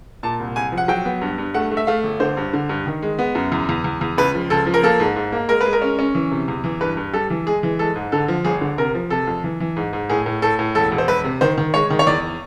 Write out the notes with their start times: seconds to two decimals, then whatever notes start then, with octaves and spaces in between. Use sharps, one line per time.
0.23 A#2 A5
0.39 C2
0.56 C2 G#5
0.72 F3
0.78 F#5
0.88 F#3 G5
1.05 B3
1.22 G2
1.38 G2
1.54 A3 F#5
1.71 A3
1.77 E5
1.87 A3 F5
2.04 G1
2.20 D3 C5
2.37 G2
2.53 D3
2.69 G2
2.87 D#3
3.02 G#3
3.19 B3
3.35 F#2
3.52 E2
3.69 E2
3.84 E2
4.01 E2
4.18 C#2 B4
4.34 F3
4.50 C#2 A4
4.66 F3
4.74 A#4
4.83 A#3 A4
5.00 G#2
5.16 G#2
5.32 A#3
5.49 G#3 A#4
5.61 B4
5.66 G#3
5.73 A#4
5.82 C#4
5.99 C#4
6.15 E3
6.31 C3
6.48 E2
6.64 E3
6.81 G2 B4
6.97 G2
7.13 G3 A4
7.30 E3
7.47 G#3 G#4
7.63 E3
7.79 G#3 A4
7.96 G#2
8.12 D3 A4
8.28 F3
8.45 G1 G#4
8.61 D3
8.78 C3 A#4
8.95 F3
9.10 C3 A4
9.28 F2
9.44 E3
9.60 E3
9.76 G#2
9.93 G#2
10.10 A2 G#4
10.26 A2
10.42 A2 A4
10.59 A2
10.75 E1 A4
10.92 E1
10.98 C5
11.08 E1 B4
11.24 C3
11.41 D#3 C5
11.58 D#3
11.74 G#3 C#5
11.90 D#3
11.99 C#5
12.07 E2 D5